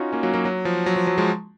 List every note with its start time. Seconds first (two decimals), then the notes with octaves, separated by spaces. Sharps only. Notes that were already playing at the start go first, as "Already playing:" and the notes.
Already playing: C#4 D#4 F4 F#4
0.13 A#3 C#4
0.23 F#3 A#3
0.34 F#3 A#3
0.45 F#3
0.65 F3
0.86 F#3
0.96 F3
1.07 F#3
1.18 F3 G#3